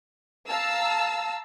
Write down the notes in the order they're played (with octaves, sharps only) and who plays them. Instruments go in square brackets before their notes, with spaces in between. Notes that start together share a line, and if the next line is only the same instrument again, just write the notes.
[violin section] F5 A5 A#5 E6